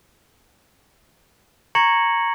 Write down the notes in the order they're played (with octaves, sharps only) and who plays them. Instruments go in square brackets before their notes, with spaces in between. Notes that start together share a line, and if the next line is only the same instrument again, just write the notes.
[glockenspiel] A#5 C#6 G#6 A#6 C#7 F#7